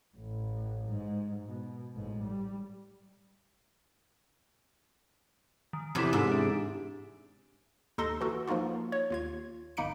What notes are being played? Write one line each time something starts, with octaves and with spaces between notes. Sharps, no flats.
A1
G#2
B2
A1 G#2
G3
D#3
E2 C3 E3 E4
G#2
D4
D#2 D#4 A4 C6 A#6
E3 F#4 A4
F3 A#3 D#4 F4 F#4
C#5
D#2 F4 G#6
G1 A#3 D#4 B5 C#7 D7